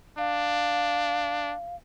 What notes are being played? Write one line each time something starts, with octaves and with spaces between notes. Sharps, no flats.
D4 F5